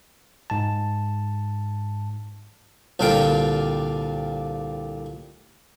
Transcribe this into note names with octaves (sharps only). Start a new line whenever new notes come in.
G#2 A5
C2 A#2 D3 G3 F5 G5